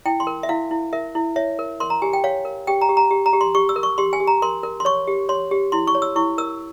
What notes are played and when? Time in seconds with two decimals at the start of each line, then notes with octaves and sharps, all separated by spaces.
0.05 E4 G5
0.20 C6
0.27 A#4
0.43 E5
0.49 E4 F5
0.71 E4
0.93 A#4 E5
1.15 E4
1.36 C#5 E5
1.59 A#4
1.80 A#4 C6
1.90 A#5
2.02 G4 G#5
2.13 G5
2.24 C#5 F5
2.45 A#4
2.67 G4 G5
2.81 A#5
2.89 G4
2.97 A#5
3.11 G4
3.26 A#5
3.33 G4
3.41 C6
3.55 G4 C#6
3.69 E6
3.76 A#4
3.83 C#6
3.98 G4 C6
4.13 G#5
4.20 G4
4.27 A#5
4.42 A#4 C6
4.63 A#4
4.80 C6
4.85 C#5 C#6
5.07 G4
5.29 C#5 C6
5.51 G4
5.72 E4 C6
5.87 C#6
5.95 C#5
6.02 E6
6.16 E4 C#6
6.38 A#4 E6